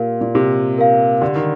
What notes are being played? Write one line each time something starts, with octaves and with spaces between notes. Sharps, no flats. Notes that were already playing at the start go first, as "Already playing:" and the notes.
Already playing: A#2 G4 A#4 F5
A#2
C3 G4
A#4 F5
D3 G4
D#3